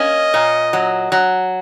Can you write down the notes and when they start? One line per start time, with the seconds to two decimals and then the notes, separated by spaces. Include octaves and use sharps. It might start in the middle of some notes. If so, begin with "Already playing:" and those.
Already playing: A#3 C#4 D#5
0.34 A#2
0.73 F#3
1.12 F#3